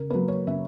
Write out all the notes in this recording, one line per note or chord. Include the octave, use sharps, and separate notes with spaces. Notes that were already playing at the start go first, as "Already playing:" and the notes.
Already playing: C#3 A#4
F#3 A#3 B4
C#5
C#3 E5